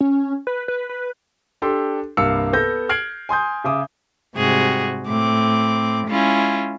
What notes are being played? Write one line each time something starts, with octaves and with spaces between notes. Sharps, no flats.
C#4
B4
B4
B4
D4 G4 A4 C6
C2 G2 A#3 F5 E6 C#7
B3 A4 G6 A#6
F6 G#6 C7 D7 F#7
G#5 C6 D#6 G6
C#3 E5 D6 D#6
G#2 C3 G3 F#4 G#4
A2 C4 D6
G#3 C#4 E4 F4